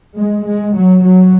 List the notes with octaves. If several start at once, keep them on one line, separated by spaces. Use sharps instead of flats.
G#3
G#3
F#3
F#3